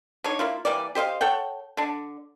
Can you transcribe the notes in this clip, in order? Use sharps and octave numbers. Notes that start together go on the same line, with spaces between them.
D3 D#4 C#5
A#3 E4 F4
E3 G3 A#3 D5
G4 C5 D#5 F5
A4 C#5 F#5 G5
D3 D4